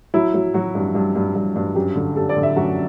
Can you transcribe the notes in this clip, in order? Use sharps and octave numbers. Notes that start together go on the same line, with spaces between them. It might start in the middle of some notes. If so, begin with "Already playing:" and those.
F#3 E4
F#3
F#3 F#4
G2
G2
G2
G2
G2
F#2 G4
D3
G3 A4
D5
D3
E5
F#2 F#4